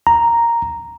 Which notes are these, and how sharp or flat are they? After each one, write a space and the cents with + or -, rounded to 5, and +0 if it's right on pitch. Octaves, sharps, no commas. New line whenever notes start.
A#5 +0